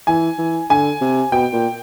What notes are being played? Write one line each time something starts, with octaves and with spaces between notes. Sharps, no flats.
E3 G#5
E3
D3 G#5
C3
B2 G5
A#2